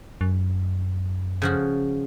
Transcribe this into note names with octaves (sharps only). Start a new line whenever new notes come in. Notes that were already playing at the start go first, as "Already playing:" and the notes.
F#2
C#3 F3 F#4